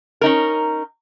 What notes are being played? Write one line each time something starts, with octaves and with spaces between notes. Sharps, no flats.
C#4 D#4 A#4